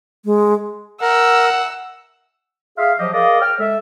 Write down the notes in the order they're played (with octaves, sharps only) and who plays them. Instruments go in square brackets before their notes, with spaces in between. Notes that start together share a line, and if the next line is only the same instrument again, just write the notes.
[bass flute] G#3
[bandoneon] A#4 [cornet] F#5 [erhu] E6
[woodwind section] G#4 E5 F5
F3 F#3 G4 D#5
G#4 A#4 D5 D#5 F5
C#5 G5 F6
G#3 A4 E5